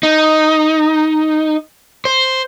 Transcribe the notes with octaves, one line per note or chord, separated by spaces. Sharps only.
D#4
C5